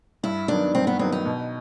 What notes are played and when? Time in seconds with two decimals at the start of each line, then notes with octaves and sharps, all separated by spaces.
0.23 G2 E4
0.48 D#3 F#3 B3 D4
0.74 G2 C4
0.87 B3
0.99 D#3 F#3 B3 C4
1.12 D#4
1.25 B2